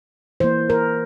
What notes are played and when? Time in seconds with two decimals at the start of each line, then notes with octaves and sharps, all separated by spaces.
0.40 E3 A#3 C5
0.70 A#4